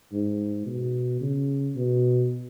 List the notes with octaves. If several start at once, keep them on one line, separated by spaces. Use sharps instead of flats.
G#2
B2
C#3
B2